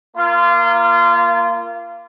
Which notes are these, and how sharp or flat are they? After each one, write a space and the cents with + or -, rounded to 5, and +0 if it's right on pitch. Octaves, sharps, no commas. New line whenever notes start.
A#3 +0 F4 -25